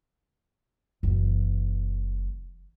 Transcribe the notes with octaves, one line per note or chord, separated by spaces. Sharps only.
F#1 E3